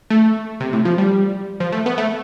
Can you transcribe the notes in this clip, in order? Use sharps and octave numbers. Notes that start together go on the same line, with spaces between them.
A3
C3
A2
F3
G3
F3
A3
B3
A3